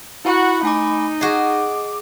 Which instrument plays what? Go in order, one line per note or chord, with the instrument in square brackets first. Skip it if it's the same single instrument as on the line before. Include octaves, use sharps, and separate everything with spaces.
[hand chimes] E4 [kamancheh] F#4 F#5 [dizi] B5
[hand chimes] A3 G#5 D6 [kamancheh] D#4
[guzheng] F#4 G#4 [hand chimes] D#5 [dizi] D6